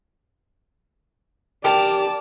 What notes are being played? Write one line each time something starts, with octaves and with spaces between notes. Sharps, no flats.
G4 A#4 D5 A5